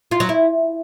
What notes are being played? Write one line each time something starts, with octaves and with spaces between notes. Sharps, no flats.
F4
F#3
E4